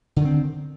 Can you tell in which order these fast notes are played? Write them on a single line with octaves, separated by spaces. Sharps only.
D3 D#3 C4